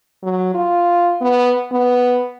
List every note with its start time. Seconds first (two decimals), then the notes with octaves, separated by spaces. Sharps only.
0.23 F#3
0.55 F4
1.21 B3
1.71 B3